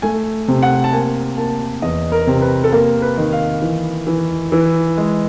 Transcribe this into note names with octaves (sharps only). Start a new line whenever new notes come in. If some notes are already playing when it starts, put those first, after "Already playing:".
A3 G#5
C3
F#5
A5
A#3 G#5
A#3 A5
E2 D#5
A#4
C3
B4
A4
A#3 A#4
B4
D#3
F5
E3
E3
E3
G#3